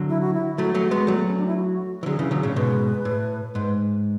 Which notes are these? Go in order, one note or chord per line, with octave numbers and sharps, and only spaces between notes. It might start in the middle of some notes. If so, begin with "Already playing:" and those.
Already playing: D3 F#3
E4
F#4
E4
F#3 A3 F#4
F#3 A3
G#3 B3
F#3 A3
B3
C#4
D4
E4
F#4
E3
D3 F#3 G#4
C#3 E3
D3 F#3
A2 C#3 C#5
G#2 B2 B4
A2
G#2